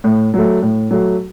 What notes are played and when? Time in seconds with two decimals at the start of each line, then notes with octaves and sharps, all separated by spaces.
0.04 A2
0.34 F#3 A3
0.62 A2
0.91 F#3 A3